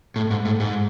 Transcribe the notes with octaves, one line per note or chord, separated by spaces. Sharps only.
A2
G#2
A2
G#2